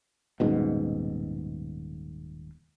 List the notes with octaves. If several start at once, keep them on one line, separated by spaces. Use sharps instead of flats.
D#1 G#2 B2